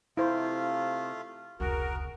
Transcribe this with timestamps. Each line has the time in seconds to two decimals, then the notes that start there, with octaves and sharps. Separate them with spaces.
0.17 C3 A3 E4 F4 C5 F5
1.60 F1 C#2 F#4 G#4 A#4